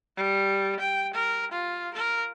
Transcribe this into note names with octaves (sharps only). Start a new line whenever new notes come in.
G3
G5
A#4
F4
A#4